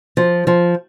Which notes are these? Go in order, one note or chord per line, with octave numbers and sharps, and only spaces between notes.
F3
F3